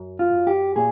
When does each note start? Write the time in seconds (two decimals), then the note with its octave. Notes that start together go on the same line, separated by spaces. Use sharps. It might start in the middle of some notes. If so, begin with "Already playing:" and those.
Already playing: F#2
0.19 F4
0.33 F#2
0.47 G4
0.76 A#2 G#4